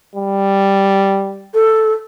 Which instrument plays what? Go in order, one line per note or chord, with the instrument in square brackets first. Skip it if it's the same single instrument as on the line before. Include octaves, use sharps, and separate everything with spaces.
[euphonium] G3
[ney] A4